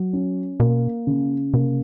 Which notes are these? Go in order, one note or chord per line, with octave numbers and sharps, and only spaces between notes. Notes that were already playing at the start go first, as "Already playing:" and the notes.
Already playing: F#3
C#4
B2 A#3
C#3
C3 A#3